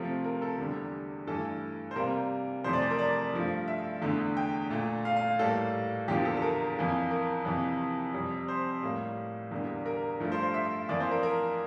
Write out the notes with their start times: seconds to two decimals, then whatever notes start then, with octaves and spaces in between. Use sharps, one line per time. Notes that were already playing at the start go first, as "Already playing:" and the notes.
Already playing: C3 F3 A3
0.24 A#4
0.42 A4
0.58 E2 D3 G3
1.27 G2 E3 A3 A4
1.91 C5
1.96 C3 G3 A#3 A#4
2.64 F2 C3 E3 A3 C5
2.73 D5
2.82 C5
2.90 A#4
2.99 D5
3.33 G2 F3 A3
3.68 E5
4.02 E2 D3 A3
4.37 G5
4.70 A#2 A3
5.05 F5
5.17 F5
5.39 A2 G3 A#3 A4
6.08 E2 D3 F3 A#3 G4
6.25 A4
6.37 A4
6.42 A#4
6.77 F2 E3 A#3
7.11 A#4
7.45 F2 C3 E3 A#3
8.14 F2 C3 G3
8.48 C5
8.83 A2 G3 A#3
9.51 E2 D3 G3 A#3
9.86 A#4
10.20 G2 F3 A3
10.32 C5
10.43 C5
10.54 E5
10.89 F2 E3 A#3 D5
11.00 C5
11.11 A#4
11.23 A#4